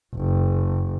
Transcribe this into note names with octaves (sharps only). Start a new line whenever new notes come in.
F#1